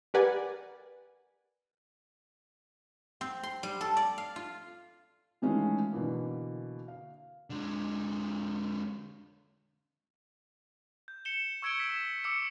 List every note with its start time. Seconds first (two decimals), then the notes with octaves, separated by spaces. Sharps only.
0.14 G4 A#4 B4 D5 F#5 G#5
3.21 C4
3.43 C6
3.63 G3
3.81 A4
3.97 D5
4.18 F5
4.36 F4
5.42 D#3 E3 G#3 A3 C#4 F4
5.92 B2 D3 E3 A#3
6.88 F5
7.50 D3 G#3
11.08 G6
11.25 C#7 E7 G7
11.62 C#6 E6 G#6 C#7 D7 G7
11.78 E6 B6 E7
12.24 D6 E6 C#7